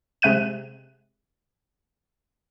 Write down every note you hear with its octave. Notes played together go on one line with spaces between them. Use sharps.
C3 G#3 E5 F#6 D#7